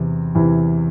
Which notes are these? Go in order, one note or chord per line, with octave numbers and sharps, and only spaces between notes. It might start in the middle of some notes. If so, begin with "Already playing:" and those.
Already playing: E2 C3 E3
E2 C3 E3